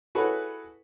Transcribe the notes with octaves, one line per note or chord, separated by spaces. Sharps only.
E4 F#4 G#4 A4 B4 C#5